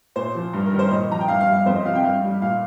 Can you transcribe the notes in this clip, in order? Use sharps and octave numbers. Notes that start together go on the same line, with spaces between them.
A#2 C5
F3
G2
A#4
D#3 G3
C5
A#2 D#5
F3 A#5
G5
G2 F5
F5
G3
F5
F2 C5
D#5
C3 F3 F5
G5
G2 F5
G3
A#2 F5